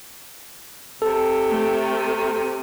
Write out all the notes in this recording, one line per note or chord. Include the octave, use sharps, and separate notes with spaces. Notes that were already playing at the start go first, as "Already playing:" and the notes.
C3 A4
A3